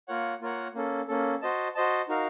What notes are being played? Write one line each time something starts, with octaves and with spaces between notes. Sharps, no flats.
A#3 F4 A#4 C#5 F#5
A#3 F4 A#4 C#5 F#5
A#3 C#4 A4
A#3 C#4 A4
F#4 C5 D#5 A5
F#4 C5 D#5 A5
D#4 F#4 A#4 F5